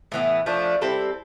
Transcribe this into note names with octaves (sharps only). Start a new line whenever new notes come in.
A2 E3 B3
F3 A3 D4
G3 C4 E4 A4